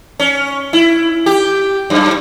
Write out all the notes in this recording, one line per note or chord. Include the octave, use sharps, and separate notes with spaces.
C#4
E4
G4
F#2